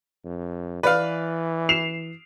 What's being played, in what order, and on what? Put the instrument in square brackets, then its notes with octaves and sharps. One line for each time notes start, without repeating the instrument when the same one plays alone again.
[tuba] F2
[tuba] E3 [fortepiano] B4 F5 [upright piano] D5
[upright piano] C7 E7 F7